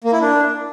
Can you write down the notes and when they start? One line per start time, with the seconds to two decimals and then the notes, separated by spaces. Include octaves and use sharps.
0.04 A#3
0.13 E4
0.21 D4